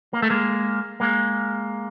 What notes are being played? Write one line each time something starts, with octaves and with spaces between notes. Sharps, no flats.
A#3
A3
G#3 A#3
G#3 A#3